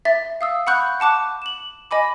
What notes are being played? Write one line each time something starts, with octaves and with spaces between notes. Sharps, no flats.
E5 A6
F5 D#6 E6
F#5 B5 C#6 F#6 G6
F#5 A5 D6 F#6
E7 F#7
D#5 G#5 B5 D6